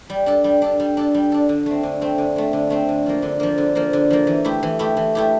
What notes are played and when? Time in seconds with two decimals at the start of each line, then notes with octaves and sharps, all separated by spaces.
0.10 G3
0.26 D4 A4
0.44 G3
0.62 D4 A4
0.80 G3
0.97 D4 A4
1.14 G3
1.32 D4 A4
1.49 D3
1.66 A3 C4
1.83 D3
2.01 A3 C4
2.18 D3
2.36 A3 C4
2.53 D3
2.70 A3 C4
2.89 D3
3.06 F3 A#3
3.22 D3
3.40 F3 A#3
3.58 D3
3.75 F3 A#3
3.93 D3
4.10 F3 A#3
4.27 E3
4.45 A3 E4 G4
4.63 E3
4.79 A3 E4 G4
4.97 E3
5.15 A3 E4 G4